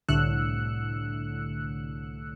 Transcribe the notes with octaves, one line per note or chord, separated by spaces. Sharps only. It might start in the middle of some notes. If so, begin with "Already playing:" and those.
C2 A2 D3 E6 F#6 C#7